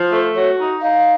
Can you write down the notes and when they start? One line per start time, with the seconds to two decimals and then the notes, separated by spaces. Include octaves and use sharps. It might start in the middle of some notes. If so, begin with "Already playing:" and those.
Already playing: F3
0.12 A3 C5
0.36 F#4 C#5
0.59 D#4
0.82 D#4 F5